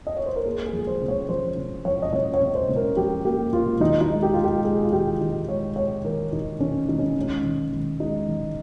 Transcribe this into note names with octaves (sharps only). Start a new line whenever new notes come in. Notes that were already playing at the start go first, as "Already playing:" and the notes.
D#5
C#5
C5
A#4
A#3 G#4
G#4
F3
C5
C#3
C#5
F3 C5
C#3
F3 C#5
D#5
C#3 C#5
C#5
C#3
C5
C#3
A#4
F3 G4
A#3 G4
A#3 F4
D#3 D#4
D#4
G#3
G4
G#3 F4
G4
G#3 G#4
F4
D#3 G4
D#3 D#4
G#3 C#5
G#3 C#5
D#3 A#4
D#3 D#4
D#3 C#4
D#3 D#4
C#4
G#3 C#4
D#3
D#3
G#3 D#4
D#3